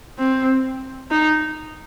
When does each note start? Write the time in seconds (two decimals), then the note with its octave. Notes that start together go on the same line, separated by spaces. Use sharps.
0.18 C4
1.11 D#4